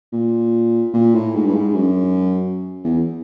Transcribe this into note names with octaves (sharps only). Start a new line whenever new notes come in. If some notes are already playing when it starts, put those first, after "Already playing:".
A#2
A#2
A2
G#2
G2
G#2
F#2
E2